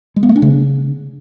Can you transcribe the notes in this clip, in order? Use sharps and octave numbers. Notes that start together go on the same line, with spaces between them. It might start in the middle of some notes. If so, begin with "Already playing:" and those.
G#3
B3
A3
D4
C#3